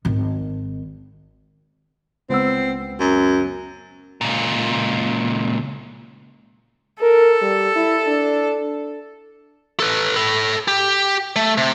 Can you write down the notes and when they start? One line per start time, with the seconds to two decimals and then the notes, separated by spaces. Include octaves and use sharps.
0.05 G#1 D#3
2.29 C#2 B3 C4 E6
3.00 F#2
4.21 C#2 A#2
7.02 A4 A#4
7.41 G3
7.76 E4
8.07 D4
9.80 A4 B4
10.16 A4 B5
10.68 G4
11.36 A3
11.58 C3